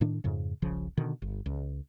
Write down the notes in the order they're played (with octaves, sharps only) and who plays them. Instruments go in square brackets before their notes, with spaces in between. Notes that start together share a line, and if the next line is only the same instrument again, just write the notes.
[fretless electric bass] A2 D#3 D4
F2 G#2 C#3
D#1 A#1 C#3 F3
B2 D3 D#3
G1
C#2